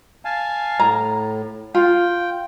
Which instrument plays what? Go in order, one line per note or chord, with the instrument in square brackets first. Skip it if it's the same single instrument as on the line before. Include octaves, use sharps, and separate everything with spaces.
[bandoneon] F5 G#5 A5
[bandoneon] A2 [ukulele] A#5
[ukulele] F4 [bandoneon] G5